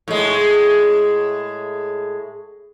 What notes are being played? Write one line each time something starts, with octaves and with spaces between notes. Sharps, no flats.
A2 G#3